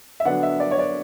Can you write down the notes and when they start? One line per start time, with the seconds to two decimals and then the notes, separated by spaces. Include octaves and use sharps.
0.20 E5
0.25 D3 F#3 B3 D4 F#5
0.43 E5
0.60 D5
0.71 C#5
0.79 D5